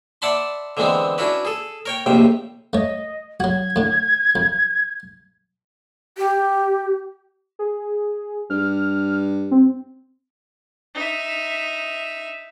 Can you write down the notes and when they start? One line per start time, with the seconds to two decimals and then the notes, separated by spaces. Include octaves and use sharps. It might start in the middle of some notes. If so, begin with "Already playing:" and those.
0.22 D5 E5 F#5 A5 B5 C6
0.77 D3 E3 G#3 B3 C4
1.18 C#4 D4 E4 F#4 B4
1.45 G#4 A4
1.86 A#4 C#5 G5
2.06 A#1 D#2 A2 C3 G5
2.73 A3 C#5 D#5
3.40 F#3 F#4 G#6
3.76 A2 D3
4.36 F2
6.17 G4
7.59 G#4
8.50 G2 F6
9.51 C4
10.95 D#4 E5